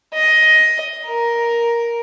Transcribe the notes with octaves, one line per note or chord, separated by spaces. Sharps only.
D#5
A#4